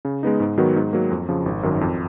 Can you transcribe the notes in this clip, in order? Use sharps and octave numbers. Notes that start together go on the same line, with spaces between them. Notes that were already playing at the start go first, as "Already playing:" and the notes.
C#3
G#3 B3 D#4
G#2
D#3 F#3 B3 F#4
G#2
F#3 A#3
F2
C#3 F3
G#1
F#2 D#3 F#3
F2